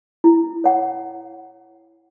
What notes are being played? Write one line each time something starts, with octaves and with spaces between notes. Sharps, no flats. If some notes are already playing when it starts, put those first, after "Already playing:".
E4
C#5 F#5